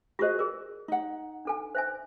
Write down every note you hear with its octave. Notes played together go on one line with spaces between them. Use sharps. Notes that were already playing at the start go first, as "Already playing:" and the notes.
F4 F#4 G#4 C5 D#5
G#4 A#4 D5
D#4 F#5
D4 A4 G#5
C5 E5 G#5